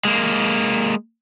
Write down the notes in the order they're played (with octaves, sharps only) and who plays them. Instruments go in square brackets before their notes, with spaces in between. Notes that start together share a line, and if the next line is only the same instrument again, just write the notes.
[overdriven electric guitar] G#3 A#3